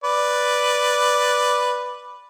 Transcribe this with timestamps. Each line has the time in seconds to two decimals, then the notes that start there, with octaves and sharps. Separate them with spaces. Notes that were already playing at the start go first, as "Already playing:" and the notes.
0.04 B4 D5